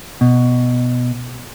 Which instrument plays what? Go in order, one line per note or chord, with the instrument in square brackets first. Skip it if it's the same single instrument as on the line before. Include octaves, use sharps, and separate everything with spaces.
[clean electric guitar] B2